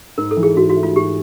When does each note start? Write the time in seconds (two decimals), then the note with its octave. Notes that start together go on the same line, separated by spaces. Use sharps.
0.18 G#2 A#4
0.31 A4
0.37 E3
0.43 G#4
0.56 G#2 F#4
0.70 F#4
0.76 A3
0.83 F4
0.96 G#2 G4